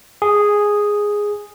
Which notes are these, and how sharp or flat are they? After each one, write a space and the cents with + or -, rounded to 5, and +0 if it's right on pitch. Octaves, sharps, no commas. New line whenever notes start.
G#4 -5